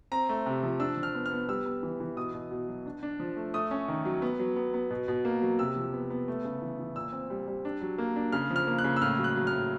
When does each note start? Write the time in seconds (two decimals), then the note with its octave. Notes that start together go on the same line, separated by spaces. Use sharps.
0.12 C4 A#5
0.29 A3
0.46 C3
0.63 F3
0.80 D4 E6
0.97 F3
1.03 F6
1.15 B3
1.26 F6
1.31 B3
1.49 G3 E6
1.66 B3
1.83 E3
2.00 E3
2.17 B2 D#6
2.34 B2
2.51 B2
2.68 F#3
2.86 D4
3.03 D4
3.20 F3
3.37 A3
3.54 A3 D#6
3.71 C#4
3.88 D#3
4.05 F#3
4.22 B3
4.39 F#3
4.56 B3
4.74 B3
4.91 B2
5.08 B2
5.25 A#3
5.42 F#3
5.59 C3 E6
5.76 F3
5.93 B3
6.10 B3
6.28 A3
6.44 C#3
6.62 E3
6.79 E3
6.96 A#2 E6
7.13 C4
7.30 G3
7.47 G3
7.65 D4
7.81 F#3
7.98 A#3
8.16 D4
8.32 C#3 F6
8.50 F3
8.56 F6
8.67 A#3
8.78 F#6
8.84 C#3
8.96 E6
9.02 A2 F6
9.18 F#3
9.24 F#6
9.36 F#3
9.47 F6
9.52 A2